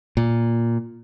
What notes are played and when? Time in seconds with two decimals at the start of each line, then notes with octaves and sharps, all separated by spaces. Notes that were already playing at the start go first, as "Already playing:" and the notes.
0.17 A#2